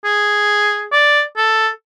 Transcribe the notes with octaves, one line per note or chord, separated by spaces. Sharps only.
G#4
D5
A4